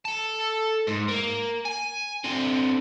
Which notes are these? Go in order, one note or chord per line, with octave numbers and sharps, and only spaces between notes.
A4 A5
G#2
A#3
G#5
D3 C4